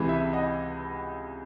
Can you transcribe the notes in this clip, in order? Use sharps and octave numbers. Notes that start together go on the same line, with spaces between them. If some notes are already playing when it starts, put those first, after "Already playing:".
Already playing: C#2 C3 E3
E5
D#5 F#5